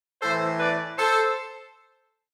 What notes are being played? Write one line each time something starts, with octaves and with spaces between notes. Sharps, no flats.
A2 E3 A4 C5
B4 D5
A4 C5